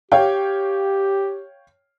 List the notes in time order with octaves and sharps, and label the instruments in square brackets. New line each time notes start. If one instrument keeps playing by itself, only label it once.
[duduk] G4 [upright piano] C#5 F5 G5